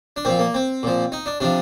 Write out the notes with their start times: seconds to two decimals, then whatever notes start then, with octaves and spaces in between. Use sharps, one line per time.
0.16 D4
0.25 A#2 F3 C4
0.39 A#3
0.54 C4
0.83 A#2 F3
1.12 D#4
1.26 D4
1.40 C3 F3 D4